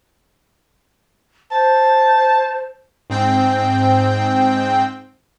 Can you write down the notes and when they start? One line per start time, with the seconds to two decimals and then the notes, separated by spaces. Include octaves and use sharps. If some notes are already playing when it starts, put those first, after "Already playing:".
1.52 C5 A5
3.10 G#2 C4 G5